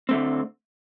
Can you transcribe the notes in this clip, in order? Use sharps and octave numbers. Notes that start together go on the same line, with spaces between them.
D3 A3 C4